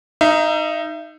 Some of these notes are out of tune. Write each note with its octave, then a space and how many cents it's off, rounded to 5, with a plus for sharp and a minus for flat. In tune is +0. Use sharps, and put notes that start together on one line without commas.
D#4 +0 E5 +35